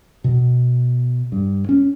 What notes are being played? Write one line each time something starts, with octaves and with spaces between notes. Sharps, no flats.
B2
G2
C#4